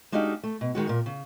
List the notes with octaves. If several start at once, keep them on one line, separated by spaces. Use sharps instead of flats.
G#3 D4 D#4 F#4 G4 F5
A3
B2
D#3 G#3 F#4
A#2 A#4
C#3